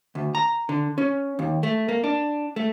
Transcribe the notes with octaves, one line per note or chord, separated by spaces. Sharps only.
D2
A#5
D3
C#4
D#2
A3
A#3
D4
A3